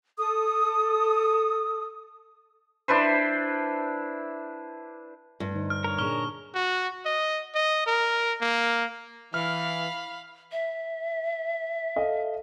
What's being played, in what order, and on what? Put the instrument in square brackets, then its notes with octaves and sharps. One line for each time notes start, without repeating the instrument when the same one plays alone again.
[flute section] A4 D#6
[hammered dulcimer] D4 E4 B4 C5
[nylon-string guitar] G2
[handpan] D3 D#4 C5
[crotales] F6
[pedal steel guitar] A#4 C#5
[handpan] A#2 D4 G#4 [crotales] C#6 F6 G7
[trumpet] F#4
D#5
D#5
A#4
A#3
[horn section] E3 [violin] F5 B5 [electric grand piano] F6
[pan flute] E5
[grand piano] A4 D#5 F5